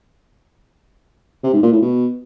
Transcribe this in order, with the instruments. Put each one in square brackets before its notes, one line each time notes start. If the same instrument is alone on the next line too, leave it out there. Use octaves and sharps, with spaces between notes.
[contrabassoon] C3
G#2
A#2
A2
B2